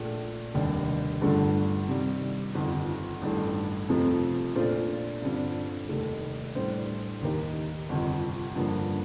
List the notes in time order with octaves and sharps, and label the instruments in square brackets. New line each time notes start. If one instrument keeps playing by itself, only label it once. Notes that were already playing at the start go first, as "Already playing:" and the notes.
Already playing: [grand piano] A#1 A#2 A3
F1 D#2 D3 G3
G1 G2 D3 A3 D4
C3 D#3 G3
G1 F2 D#3
A1 G2 D#3 A3
F2 C3 F3 A3 C4
A#2 A3 D4 F4 C5
G2 D3 G3 C4 F4
F1 D#2 D#3 A3
A2 G3 D4 G4 C5
D#2 D#3 A#3 D#4 G4
G1 F2 C3
G2 D3 F3 A#3